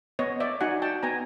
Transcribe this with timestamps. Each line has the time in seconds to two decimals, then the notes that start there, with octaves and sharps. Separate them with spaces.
0.19 B3 C#5 D#5
0.40 D5 E5
0.61 D#4 F#4 F#5 G#5
0.82 G5 A5
1.03 B3 G#5 A#5